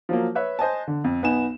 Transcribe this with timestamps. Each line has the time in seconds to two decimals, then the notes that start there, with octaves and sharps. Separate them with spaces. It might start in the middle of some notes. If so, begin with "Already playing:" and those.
0.09 F3 F#3 A#3
0.35 B4 C#5 E5 F#6
0.59 C5 D#5 G#5 A5
0.88 D3
1.04 F2
1.22 B1 B3 D#4 G#5 E7